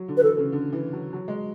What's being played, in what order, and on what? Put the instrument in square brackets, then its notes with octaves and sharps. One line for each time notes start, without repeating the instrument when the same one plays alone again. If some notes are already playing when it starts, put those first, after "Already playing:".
Already playing: [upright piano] F#3
D3
[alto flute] B4
[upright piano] E3 [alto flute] A4
[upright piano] C#3
D3
E3
F#3
F#3
G#3